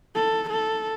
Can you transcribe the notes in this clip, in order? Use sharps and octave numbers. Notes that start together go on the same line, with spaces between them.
A4
A4